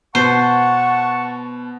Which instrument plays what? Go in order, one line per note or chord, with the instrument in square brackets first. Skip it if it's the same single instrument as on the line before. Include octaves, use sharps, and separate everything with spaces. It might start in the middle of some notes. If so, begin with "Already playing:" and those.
[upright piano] B2 [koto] C5 [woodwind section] F#5 C#6 [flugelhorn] A5